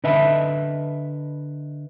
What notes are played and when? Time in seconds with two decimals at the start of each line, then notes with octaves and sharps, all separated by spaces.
0.04 D3 B4 D#5 E5 A5 B5